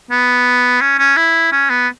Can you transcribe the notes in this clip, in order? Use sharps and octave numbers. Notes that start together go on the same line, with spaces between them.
B3
C#4
C#4
E4
C#4
B3